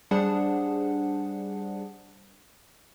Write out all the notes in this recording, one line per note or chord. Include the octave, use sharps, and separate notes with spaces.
G3 D4 G#4 C5 F#5